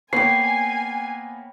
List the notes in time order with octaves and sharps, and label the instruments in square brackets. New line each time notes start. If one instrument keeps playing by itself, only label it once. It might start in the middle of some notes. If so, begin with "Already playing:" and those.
[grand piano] A#3 B3 [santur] C#5 G5 [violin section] G#5 [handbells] C7